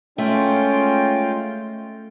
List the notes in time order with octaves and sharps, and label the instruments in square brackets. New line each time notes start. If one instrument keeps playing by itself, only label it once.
[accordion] G#3 F4 G5 [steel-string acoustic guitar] A3 [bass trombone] C#4